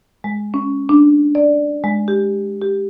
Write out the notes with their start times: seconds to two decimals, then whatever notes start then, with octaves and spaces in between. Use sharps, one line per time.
0.24 G#3
0.54 C#4
0.89 D4
1.35 D5
1.84 G#3
2.08 G4
2.62 G4